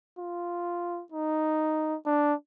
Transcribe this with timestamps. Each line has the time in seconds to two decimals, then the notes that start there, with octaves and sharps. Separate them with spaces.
0.18 F4
1.12 D#4
2.06 D4